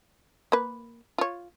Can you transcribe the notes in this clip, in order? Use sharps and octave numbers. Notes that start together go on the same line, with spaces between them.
A#3 B4
F4 C#5